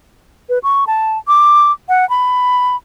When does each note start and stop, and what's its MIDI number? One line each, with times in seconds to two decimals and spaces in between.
0.49 0.58 71
0.63 0.84 85
0.87 1.18 81
1.28 1.72 86
1.89 2.08 78
2.10 2.76 83